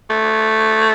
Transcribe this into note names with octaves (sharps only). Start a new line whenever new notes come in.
A3